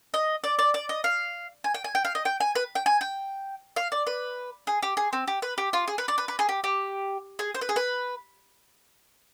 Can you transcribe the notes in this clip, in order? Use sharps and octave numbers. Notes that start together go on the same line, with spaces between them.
D#5
D5
D5
D5
D#5
F5
G#5
G5
G#5
G5
F5
D#5
G5
G#5
B4
G5
G#5
G5
F5
D5
B4
G#4
G4
G#4
C4
G4
B4
G4
F4
G#4
B4
D5
B4
B4
G#4
G4
G4
G#4
C5
B4
G#4
B4